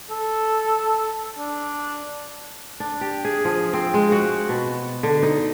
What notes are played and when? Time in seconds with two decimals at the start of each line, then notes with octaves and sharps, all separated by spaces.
0.11 A4
1.39 D4
2.80 D4
3.01 G4
3.25 G#4
3.45 F3
3.73 C4
3.94 G#3
4.12 F#4
4.49 B2
5.03 D3
5.23 D#4